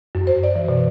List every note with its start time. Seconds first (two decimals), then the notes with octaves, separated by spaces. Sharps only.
0.15 F#2
0.27 C5
0.43 D5
0.56 E3
0.68 B2